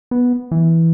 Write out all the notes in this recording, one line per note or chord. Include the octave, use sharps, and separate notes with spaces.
B3
E3